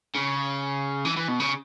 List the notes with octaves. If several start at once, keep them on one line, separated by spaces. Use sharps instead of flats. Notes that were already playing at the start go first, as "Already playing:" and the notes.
C#3
E3
E3
B2
C#3